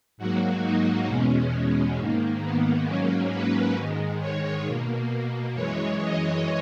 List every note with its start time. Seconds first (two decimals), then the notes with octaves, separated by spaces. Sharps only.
0.18 G#2 F#3 A#3 F#4
0.63 D#4
1.07 E2 B2 G#3 C#4
1.52 C#4
1.96 G#2 D#3 A#3
2.42 B3
2.87 G#2 F#3 A#3 C#4
3.32 B4
3.76 G#2 D#3 G#3
4.20 C#5
4.65 B2 A#3
5.54 F#2 E3 G#3 C#5
5.99 D#5